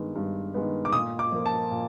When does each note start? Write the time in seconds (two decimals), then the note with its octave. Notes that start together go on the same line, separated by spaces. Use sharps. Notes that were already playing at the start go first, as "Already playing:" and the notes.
Already playing: G2 D#3 G#3 B3
0.15 G2
0.54 D#3 G#3 B3
0.85 D6
0.93 A#2 D#6
1.19 D6
1.32 F3 A#3
1.46 A5
1.71 A#2